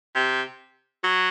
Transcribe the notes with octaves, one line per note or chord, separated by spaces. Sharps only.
C3
F#3